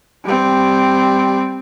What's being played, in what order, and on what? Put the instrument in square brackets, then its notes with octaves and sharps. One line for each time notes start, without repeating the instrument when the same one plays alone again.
[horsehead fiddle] G3 C4